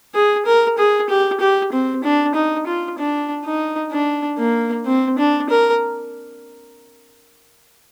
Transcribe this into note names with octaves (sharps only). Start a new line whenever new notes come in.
G#4
A#4
G#4
G4
G4
C4
D4
D#4
F4
D4
D#4
D4
A#3
C4
D4
A#4